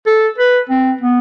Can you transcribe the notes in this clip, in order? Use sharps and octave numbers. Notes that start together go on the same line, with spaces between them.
A4
B4
C4
B3